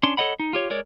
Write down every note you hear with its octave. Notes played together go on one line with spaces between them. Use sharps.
C#4 D4 C6
A4 C#5 D#5 F#5 B5
D#4
F4 G4 C#5
G#3 A#4 C#5 D5